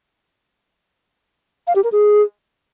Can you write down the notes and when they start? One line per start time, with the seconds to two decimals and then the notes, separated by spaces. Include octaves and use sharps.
1.67 F5
1.76 G4
1.84 A#4
1.92 G#4